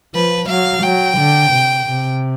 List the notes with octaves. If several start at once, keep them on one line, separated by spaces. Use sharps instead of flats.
F3 B4
F#3 F5
F#3 G5
D3
C3
C3